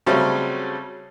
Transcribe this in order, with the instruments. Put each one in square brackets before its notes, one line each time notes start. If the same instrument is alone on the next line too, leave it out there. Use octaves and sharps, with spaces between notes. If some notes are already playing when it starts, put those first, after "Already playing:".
[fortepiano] C#3 F#3 G3 A3 C4 C#4